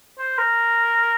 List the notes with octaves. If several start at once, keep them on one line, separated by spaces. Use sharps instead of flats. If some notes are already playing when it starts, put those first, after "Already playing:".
C5
A#4